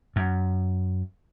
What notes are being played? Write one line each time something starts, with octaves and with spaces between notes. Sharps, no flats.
F#2